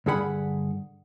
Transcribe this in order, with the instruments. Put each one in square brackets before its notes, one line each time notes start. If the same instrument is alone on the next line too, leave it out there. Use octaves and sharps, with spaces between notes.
[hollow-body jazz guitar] G2 D3 G#4 F#5 B5